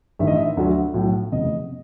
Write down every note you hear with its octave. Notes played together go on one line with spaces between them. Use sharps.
A1 G2 D#3 E5
D#5
E5
D2 D3 F#3
B1 A2 F#3
F1 E2 C#3 D#5